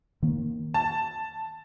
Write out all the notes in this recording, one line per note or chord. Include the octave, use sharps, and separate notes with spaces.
D#3 A#3
A5